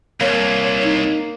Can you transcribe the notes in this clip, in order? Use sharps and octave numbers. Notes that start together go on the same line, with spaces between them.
C2 A#3 C#5
D#4